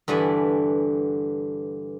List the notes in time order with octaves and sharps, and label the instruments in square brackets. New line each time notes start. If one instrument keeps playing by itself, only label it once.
[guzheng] G2 D3 E3 D5 G#5